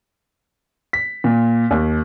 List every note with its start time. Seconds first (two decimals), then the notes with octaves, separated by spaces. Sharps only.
0.93 B6
1.24 A#2
1.71 D#2